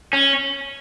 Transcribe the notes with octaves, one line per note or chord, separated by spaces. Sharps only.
C#4